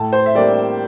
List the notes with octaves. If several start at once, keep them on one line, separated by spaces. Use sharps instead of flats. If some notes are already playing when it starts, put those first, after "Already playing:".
Already playing: A2 A5
C5
E5
G3 A#3 D4 D5